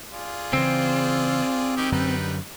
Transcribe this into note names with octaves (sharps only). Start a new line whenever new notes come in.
F4 G#4 D5
C#3 E3 C4
D#3 G#3 G4
F#2 D3 G3 D#4 B4